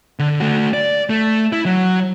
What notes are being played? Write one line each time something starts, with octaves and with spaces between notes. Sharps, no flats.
D3
A3 F#4
D5
A3
E4
F#3